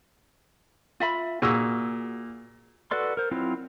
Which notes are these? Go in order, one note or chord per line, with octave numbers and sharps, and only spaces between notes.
F4 E5 B5
A#2 F#4 G#4 E6
F#4 A4 B4 D5 C6
A#4 C5
F#3 C4 E4 F4